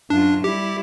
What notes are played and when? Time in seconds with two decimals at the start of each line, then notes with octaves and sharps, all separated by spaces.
0.10 F#2 D4 F4
0.44 G3 E4 G4